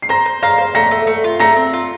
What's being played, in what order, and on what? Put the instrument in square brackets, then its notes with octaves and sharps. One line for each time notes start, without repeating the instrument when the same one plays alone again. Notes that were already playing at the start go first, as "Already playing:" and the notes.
[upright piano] C7
[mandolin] C5 [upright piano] A#5 A#6
[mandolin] C5
[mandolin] F5 [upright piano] A#5 A#6
[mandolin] C5
[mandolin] A3 [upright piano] A#5 A#6
[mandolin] A3
A3
F4
[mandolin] A3 [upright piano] A#5 A#6
[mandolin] C4
F4